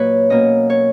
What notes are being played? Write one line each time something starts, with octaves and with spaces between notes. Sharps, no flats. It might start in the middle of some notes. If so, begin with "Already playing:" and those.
Already playing: A#2 F#3 A#3 B4 C#5 D#5
B2 A#3 C#4 D#5
C#5